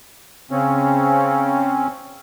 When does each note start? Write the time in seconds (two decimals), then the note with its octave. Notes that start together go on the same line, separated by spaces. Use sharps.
0.51 C#3 C4 C#4